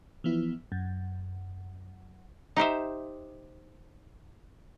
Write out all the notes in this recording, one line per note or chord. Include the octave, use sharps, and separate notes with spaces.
E3 F3 B3 E4
F#2
D#4 G4 C5 E5